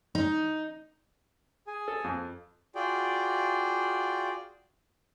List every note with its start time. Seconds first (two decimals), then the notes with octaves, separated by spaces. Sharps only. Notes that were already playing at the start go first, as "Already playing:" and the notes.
0.15 D#4
1.67 G#4 G#5
1.88 A4
2.04 F2
2.75 F4 F#4 G#4 D5 G5